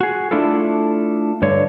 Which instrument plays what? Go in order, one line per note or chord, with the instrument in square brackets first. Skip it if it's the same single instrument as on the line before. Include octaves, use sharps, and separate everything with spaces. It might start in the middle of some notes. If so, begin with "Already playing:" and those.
[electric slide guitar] F#4 G#4
A3 D4 E4 F4 A4
G2 D3 C#5